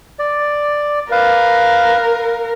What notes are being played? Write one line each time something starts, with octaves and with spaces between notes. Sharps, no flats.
D5
A#4 B4 F5